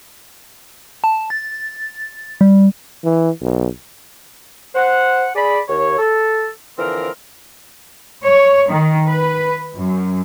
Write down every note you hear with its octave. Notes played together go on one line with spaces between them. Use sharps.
A5
A6
G3
E3
B1
C5 F#5
G#4 D5 B5
D#2 C#5
A4
D3 E3 F3 C4 A#4
C#5
D#3
B4
F#2